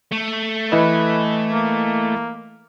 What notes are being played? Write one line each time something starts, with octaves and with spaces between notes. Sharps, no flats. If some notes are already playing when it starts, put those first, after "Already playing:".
A3
E3 E4 B4 D#5
A#3